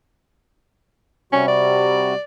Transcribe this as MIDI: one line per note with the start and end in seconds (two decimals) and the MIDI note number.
1.33 2.14 48
1.33 2.14 55
1.33 1.45 61
1.33 2.14 66
1.48 2.23 74